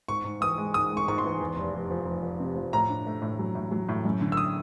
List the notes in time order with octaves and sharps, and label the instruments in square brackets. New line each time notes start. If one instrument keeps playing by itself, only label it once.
[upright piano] G#2 [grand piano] C#6
[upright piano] G#2
[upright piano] E3 [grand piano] D#6
[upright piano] G#3
[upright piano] G#2 [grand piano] D#6
[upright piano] G#3
[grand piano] C#6
[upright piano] G#2 [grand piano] C#6
[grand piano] C6
[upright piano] E3
E2
F1
F1
F3
F1
F3
C3
F3
[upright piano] A2 [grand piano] A#5
[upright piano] D4
A3
A2
F#3
A2
F#3
A2
F#2
D3
[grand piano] E6
D#6